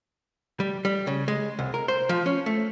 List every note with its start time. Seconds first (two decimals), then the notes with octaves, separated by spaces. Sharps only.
0.60 G3
0.85 G3
1.07 C#3
1.28 G#3
1.59 C2
1.74 A#4
1.88 C5
2.09 F3
2.26 C#4
2.46 A3